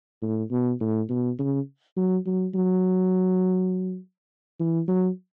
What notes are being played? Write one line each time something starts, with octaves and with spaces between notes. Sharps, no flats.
A2
B2
A2
B2
C#3
F#3
F#3
F#3
E3
F#3